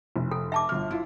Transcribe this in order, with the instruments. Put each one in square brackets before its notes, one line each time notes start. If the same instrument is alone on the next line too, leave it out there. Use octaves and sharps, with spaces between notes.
[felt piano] F1
[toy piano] A4
E5 A5 D6
[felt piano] G1 F6
E4 F4